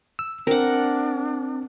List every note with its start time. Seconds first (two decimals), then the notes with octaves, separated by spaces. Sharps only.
0.19 E6
0.47 C4 D4 A#4 F#5